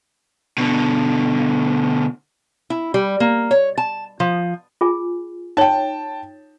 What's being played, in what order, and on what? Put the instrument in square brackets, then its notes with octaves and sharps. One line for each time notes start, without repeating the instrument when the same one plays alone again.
[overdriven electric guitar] B2 D3
[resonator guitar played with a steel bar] E4
G3
A#3
C#5
A5
F3
[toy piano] F4 G#4 G#5
[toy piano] D#4 C#5 [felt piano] G5 A5